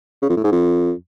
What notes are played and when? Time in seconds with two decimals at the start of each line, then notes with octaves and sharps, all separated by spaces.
0.22 C#3
0.29 F2
0.37 A2
0.44 G#2
0.51 F2